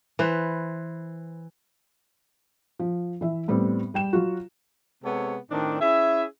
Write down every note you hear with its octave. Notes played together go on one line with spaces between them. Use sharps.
E3 B4 C5
F3
E3 E5
A2 G3 B3 C4
G3 G5 E7
F#3 F4 F#4
C3 G#3 B3 C4 A4 C#5
A2 D#3 C4 D4
C#4 E4 G#4 E5